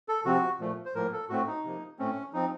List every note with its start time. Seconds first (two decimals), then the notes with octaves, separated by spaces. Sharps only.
0.09 A4
0.25 C3 F3 C4 F#4
0.60 A#2 F3 A3
0.85 C5
0.95 A2 F3 A#3 A#4
1.13 A4
1.29 A2 A3 C4 F#4
1.47 D#4
1.64 C3 F3 A#3
1.99 A2 A3 C4 C#4
2.33 F3 C4 D#4